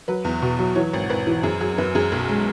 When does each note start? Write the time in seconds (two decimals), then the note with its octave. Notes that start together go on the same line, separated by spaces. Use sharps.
0.08 F#3 B4
0.25 E2
0.42 B2
0.59 F#3
0.75 E3 C#5
0.93 G#1
1.10 G#1 B4
1.27 E3
1.43 F#2 G#4
1.60 F#3 G#4
1.78 F#2 B4
1.95 F#2 G#4
2.12 B1
2.29 G#3